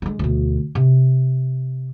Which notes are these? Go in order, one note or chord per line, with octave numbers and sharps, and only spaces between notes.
D3 G#3
D2 B2
C3